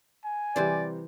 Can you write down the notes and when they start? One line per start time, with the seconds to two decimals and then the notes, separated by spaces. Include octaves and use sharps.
0.25 G#5
0.56 C3 E3 G3 C5 D5 C6